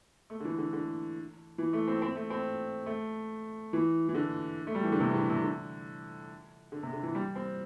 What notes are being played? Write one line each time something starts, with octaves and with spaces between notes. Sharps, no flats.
A3
D3
E3
D3
D3
E3
A3
C4
C4
A3
C4
A3
E3
E3
D3
A3
G3
E3
D3
C3
E3
D3
C3
D3
D3
C3
D3
E3
G3
C4